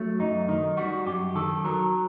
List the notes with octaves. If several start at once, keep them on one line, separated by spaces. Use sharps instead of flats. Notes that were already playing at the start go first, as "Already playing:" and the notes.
Already playing: F#3 A3
F#2 D#4
D#3 D#4
G3 F#4
F#2 G4
D#3 A4
F#3 A#4